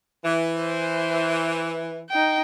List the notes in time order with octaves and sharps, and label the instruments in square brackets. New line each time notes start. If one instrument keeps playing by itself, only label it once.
[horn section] E3
[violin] C5
D#4 G5